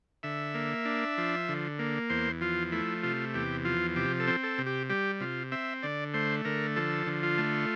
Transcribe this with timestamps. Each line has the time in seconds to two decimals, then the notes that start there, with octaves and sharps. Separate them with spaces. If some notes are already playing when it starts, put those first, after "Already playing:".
0.23 D3 E5
0.54 A#3
0.85 D4
1.18 F3
1.49 D3
1.79 A#3
2.10 E2 C5
2.41 F3 F4
2.72 A3 E4
3.03 C3 F4
3.34 E2 G4
3.65 F3 F4
3.96 C3 G4
4.20 A4
4.28 C4
4.43 A4
4.58 C3
4.66 G4
4.90 G3 G4
5.20 C3 F4
5.52 C4 E5
5.83 D3 D5
6.14 A3 C5
6.45 D3 A#4
6.76 F3 A4
7.07 D3
7.23 F4
7.38 A3